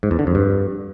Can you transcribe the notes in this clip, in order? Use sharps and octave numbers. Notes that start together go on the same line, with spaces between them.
G#2
E2
D3
F2
G2